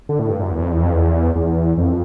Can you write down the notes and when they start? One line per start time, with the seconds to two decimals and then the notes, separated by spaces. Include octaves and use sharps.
0.09 D3
0.19 A2
0.30 G2
0.40 F#2
0.52 E2
0.62 F2
0.72 E2
0.83 F2
0.93 E2
1.36 E2
1.78 F2